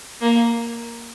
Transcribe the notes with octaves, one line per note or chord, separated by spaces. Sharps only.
A#3